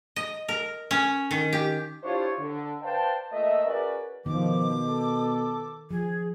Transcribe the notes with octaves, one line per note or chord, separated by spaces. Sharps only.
D#5
A#4
C#4
D#3
G4
D4 E4 F4 G4 C5 C#5
D3
B4 C5 D5 F5 G5 A5
A#2 A3 D#5 E5
C#4 F#4 G#4 A#4 B4 D5
B2 D#3 F3 D6
A4
F3 G#4